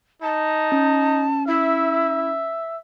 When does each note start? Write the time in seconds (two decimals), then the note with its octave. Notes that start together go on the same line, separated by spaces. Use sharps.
0.22 D#4 A5
0.72 C#4
1.47 E4 E5